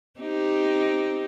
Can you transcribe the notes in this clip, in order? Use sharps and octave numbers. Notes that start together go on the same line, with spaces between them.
C4 D#4 G4